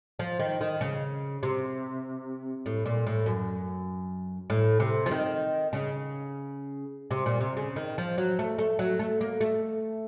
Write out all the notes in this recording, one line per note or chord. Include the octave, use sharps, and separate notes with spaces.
F3
D#3
D#3
C#3
C3
A2
A#2
A2
F#2
A2
C3
F3
D#3
C#3
C3
A#2
C3
C#3
D#3
F3
F#3
A3
A3
F#3
A3
A#3
A3